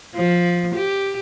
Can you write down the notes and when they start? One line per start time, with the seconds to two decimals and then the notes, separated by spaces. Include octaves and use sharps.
0.15 F3
0.75 G4